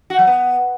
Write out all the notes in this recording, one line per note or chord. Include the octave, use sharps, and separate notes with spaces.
F#4
F#3
B3